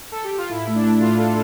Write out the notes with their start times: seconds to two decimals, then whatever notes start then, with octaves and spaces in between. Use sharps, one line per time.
0.12 A4
0.24 G4
0.37 F4
0.50 A2 E4
0.67 A3
0.75 D4
0.84 A3
1.00 A2 F4
1.18 A3 A4